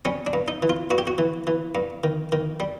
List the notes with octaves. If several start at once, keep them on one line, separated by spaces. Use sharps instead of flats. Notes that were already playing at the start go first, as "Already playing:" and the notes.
G3 C#4
D4
G2
D#4
E3
F4
G2 F#4
G4
F#4
E3
E3
G2
D#3
D#3
G3